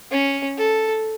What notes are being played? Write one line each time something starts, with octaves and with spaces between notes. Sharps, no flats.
C#4
A4